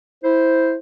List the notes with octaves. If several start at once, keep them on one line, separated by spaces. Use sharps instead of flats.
E4 C5